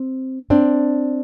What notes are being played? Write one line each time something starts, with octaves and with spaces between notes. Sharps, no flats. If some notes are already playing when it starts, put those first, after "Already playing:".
Already playing: C4
C4 D4